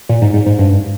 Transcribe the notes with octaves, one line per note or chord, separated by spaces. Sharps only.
A#2
G#2
G#2
G#2
G2